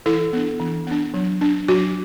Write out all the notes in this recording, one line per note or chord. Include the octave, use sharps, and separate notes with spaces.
E3 E4 A4
B3 D4
E3
B3 D4
F#3
D4
F#3 F#4